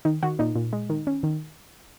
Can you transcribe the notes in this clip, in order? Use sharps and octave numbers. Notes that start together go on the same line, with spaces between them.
D#3 D#4
D#3 F#4
A#2 D#4
A#2
G#3
D#3
C#4
D#3